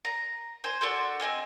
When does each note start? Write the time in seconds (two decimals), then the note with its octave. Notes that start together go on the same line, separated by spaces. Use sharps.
0.05 A#5
0.64 C5 G#5
0.81 D4 F#4 A4 C5
1.20 C4 D#5 G#5 F6